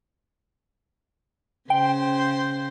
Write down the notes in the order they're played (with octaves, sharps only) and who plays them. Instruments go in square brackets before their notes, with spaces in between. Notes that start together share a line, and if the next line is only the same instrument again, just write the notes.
[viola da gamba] C#3 C5 [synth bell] G5